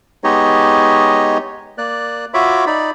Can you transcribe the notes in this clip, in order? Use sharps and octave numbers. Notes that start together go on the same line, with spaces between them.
G#3 B3 D#4 G4 C#5 D#5
A#3 D5 F#6
F4 F#4 C#5 E5 B5 D6
D#4 D5 B5